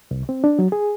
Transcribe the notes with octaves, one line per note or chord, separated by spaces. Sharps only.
C2
C4
D4
F#3
G#4